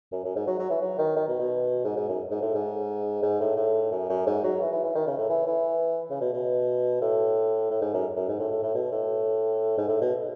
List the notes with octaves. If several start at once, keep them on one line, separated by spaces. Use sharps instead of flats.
F#2
F#2
G#2
F#3
F#3
E3
F#3
D#3
D#3
B2
B2
G#2
G#2
F#2
G#2
A2
G#2
G#2
A2
A2
F#2
F#2
G#2
F#3
E3
E3
E3
D#3
C#3
A2
E3
E3
C#3
B2
B2
A2
A2
G#2
F#2
F#2
G#2
A2
A2
A2
B2
A2
G#2
A2
B2